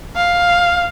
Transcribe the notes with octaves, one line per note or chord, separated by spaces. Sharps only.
F5